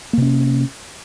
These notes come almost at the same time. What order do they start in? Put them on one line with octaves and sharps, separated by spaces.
A#3 C3 C#4